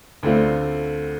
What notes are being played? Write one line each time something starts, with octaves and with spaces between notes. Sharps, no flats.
D2 D3 A3 C4 F4